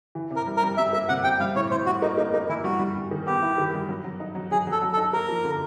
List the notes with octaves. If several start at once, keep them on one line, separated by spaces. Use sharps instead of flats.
E3
C3
A#4
G3
A#4
G3
G3 E5
A#3 E5
C3 F#5
C3 G5
G3 F5
A2 C#5
A2 C5
G3 F#4
A#3 D#4
A#3 D#4
A#3 D#4
E3 E4
G3 F#4
G3
G3
D#3
B3 G4
E4
D#3
G3
F#3
F#3
D#4
F#3
F#3 G#4
F#3 A4
F#3
A4
D#4
A#3 A#4
F3
D3